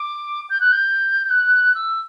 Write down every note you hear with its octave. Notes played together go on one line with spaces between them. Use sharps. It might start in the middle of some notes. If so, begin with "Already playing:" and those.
Already playing: D6
G6
F#6
G6
F#6
E6